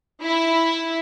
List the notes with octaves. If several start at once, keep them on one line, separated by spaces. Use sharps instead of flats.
E4